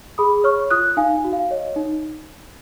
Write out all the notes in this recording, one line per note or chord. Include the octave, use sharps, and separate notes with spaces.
G#4 B5 D#6
C#5 C#6 F6
F4 D#6 F#6
D#4 F5 G#5
F#4
F5
C#5 D#5
D#4